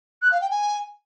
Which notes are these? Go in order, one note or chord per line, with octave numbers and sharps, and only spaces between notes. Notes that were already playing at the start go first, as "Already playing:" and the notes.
F#6
F5
G5
G#5